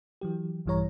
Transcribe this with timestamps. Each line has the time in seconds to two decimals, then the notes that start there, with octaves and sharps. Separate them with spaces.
0.21 E3 F#3 G4
0.66 A#1 G2 E3 G3 C#5 A#5